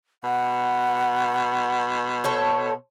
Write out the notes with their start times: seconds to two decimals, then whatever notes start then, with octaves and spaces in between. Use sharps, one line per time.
0.24 B2 F#5
2.24 A4 C5 C#5